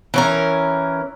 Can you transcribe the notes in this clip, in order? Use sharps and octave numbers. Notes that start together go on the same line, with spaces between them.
E3 C#4 A#4